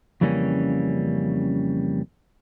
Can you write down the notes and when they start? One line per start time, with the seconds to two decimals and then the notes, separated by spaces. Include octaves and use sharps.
0.21 F2 C#3 E3 G3 A#3 C#4